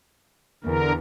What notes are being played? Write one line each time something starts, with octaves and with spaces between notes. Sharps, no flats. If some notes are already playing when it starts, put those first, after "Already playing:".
E2 D3 A#4